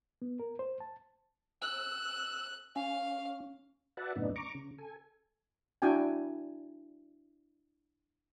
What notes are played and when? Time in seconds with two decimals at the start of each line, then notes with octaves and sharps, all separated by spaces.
0.22 B3
0.40 A#4
0.59 C5
0.80 A5
1.62 E6 F#6
2.76 C#4 F5
3.97 F#4 B4 D5 E5 F#5 A5
4.16 F#2 A2 C#3 B3 D4 D#4
4.36 A#5 C#6 D6
4.55 C#3
4.78 A4 G#5
5.82 D4 E4 F#4 G5 G#5